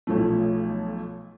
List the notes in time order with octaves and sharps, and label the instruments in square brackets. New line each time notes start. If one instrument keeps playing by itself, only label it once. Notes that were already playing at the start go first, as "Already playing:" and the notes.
[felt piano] B1 F3 A3